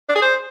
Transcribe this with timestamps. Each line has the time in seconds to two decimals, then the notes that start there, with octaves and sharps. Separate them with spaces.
0.09 D4
0.16 G#4
0.22 C5